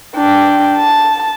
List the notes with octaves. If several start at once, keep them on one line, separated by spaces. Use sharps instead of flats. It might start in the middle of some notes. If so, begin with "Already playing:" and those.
D4 G5
A5